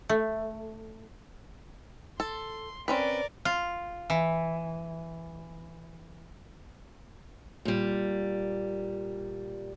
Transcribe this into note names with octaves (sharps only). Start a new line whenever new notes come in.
A3
A4 C6
C4 C#4 A#4 B4 D5
F4
E3
A#2 G3